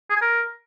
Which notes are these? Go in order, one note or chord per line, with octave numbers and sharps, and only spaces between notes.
G#4
G#5
A#4